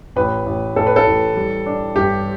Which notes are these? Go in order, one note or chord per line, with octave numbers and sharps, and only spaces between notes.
A1 B4
A1
A1 A4
B4
A4
A1
G3
D4
G2 G4